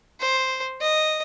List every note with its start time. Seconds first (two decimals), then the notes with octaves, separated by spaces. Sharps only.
0.20 C5
0.81 D#5